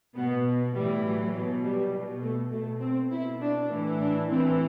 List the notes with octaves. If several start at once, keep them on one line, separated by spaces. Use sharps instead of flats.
B2 B3
A2 E3 G3
F#3
B2 F#3
G3
B2
A3
B2 A3
C4
B2 E4
D4
A2 E3
D4
A2 E3 C4